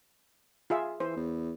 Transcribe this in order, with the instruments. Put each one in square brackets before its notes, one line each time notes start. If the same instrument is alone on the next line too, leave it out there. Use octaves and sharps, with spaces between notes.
[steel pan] F4 G#4 E5
[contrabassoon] E3 [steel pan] C5
[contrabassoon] E2